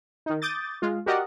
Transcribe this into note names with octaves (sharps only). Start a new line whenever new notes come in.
D#3 D#4
D6 D#6 G6 A6
G#3 F4
F#4 G4 A#4 D5 D#5 F#5